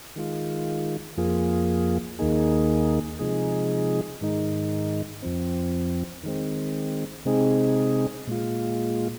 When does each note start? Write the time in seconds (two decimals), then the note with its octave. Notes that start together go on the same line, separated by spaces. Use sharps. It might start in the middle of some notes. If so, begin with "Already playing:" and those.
0.16 D#3 G#3 F4
1.17 F2 F3 A#3 F4 G#4
2.19 D#2 D#3 A#3 D#4 G#4
3.19 C3 F3 G#3 D#4 G#4
4.21 G#2 D#3 G#3 D#4
5.22 F2 F3 C4
6.23 D#3 G#3 C4
7.25 C3 G#3 C4 D#4 G#4
8.27 A#2 G#3 F4